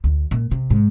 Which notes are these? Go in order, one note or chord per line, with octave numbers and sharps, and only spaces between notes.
D2
A#2
C3
G#2